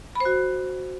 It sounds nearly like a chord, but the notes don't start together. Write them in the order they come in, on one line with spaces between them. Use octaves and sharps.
B5 C5 F#4